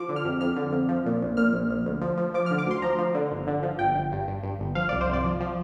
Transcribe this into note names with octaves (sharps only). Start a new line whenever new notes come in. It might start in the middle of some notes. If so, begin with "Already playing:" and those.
Already playing: F3 D6
D3
F6
F2
F2 F6
D3
F2
F3
A#2
A#1
A#2 F6
A#1
A#1
D2
F3
F3
F3 D6
D3 F6
D6
D2 C6
F3 A#5
F3
D3
G1
D3
F3
G1 G5
G1
G2
G2
G2
G1
F3 F5
C2 D5
C5
C2 D5
F3
F3